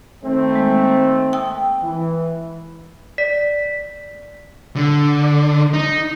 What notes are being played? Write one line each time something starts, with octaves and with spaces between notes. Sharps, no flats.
D#3 A3 C4
G#3 A#3
G5 D#6 E6
E3
D5 B6
D3
D#4